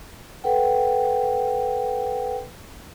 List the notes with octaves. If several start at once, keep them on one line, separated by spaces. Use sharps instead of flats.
A4 B4 F#5 G5